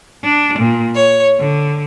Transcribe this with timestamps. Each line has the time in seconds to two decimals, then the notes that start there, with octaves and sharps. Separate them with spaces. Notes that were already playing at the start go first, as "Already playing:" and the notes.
0.22 D4
0.57 A#2
0.95 C#5
1.38 D3